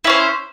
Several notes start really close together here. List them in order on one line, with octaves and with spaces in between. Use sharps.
E4 C#4 C5